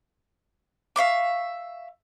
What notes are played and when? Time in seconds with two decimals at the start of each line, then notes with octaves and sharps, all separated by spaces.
0.96 E5 F5 C#6 D6